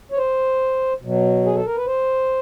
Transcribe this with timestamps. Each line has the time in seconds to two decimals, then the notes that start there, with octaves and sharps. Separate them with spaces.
0.12 C#5
0.17 C5
1.02 B2 F#3
1.45 G#4
1.55 A4
1.66 A#4
1.76 B4
1.86 C5